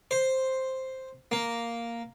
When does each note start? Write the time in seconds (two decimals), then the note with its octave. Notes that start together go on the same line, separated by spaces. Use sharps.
0.11 C5
1.31 A#3